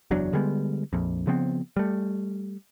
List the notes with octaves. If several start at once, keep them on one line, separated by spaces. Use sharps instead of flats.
F#1 E2 F#3 D4
D3 G3 G#3 B3
A#1 F2
C#3 F3 B3 C4
G3 A3